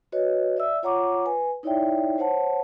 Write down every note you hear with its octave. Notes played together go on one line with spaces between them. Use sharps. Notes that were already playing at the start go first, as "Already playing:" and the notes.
F#4 B4 C#5 D#5
D5 E5 E6
F4 C#5 F#5 A#5 C#6 D6
B4 G#5
D#4 E4 C#5 D5 E5 G5
C5 C#5 F#5 A5